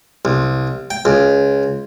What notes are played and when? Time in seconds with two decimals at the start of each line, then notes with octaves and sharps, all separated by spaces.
0.25 C2
0.91 G5
1.05 C#2